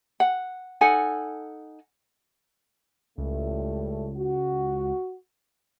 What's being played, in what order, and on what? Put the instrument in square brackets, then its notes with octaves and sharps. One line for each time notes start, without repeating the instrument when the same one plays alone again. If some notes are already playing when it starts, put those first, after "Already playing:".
[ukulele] F#5
D#4 A4 F#5 G#5
[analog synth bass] C#2 [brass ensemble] A2 G3 A3
[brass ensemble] F#4